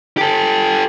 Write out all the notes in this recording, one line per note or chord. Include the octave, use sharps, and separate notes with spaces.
G4 A4